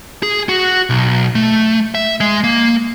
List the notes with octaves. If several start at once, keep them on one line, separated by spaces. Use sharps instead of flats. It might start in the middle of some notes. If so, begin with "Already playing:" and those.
G#4
F#4
B1
A3
E5
G#3
A#3